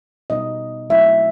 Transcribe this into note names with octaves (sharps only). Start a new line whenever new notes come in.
B2 G3 B3 D#4 D#5
F#3 A3 C4 E4 E5